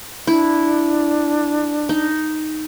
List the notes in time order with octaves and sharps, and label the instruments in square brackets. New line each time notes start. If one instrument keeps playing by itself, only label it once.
[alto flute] D4 [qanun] E4
[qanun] D#4